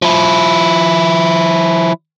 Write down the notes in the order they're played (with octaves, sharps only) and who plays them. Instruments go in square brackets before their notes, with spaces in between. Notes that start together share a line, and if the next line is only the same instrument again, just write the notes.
[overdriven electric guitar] F3 E4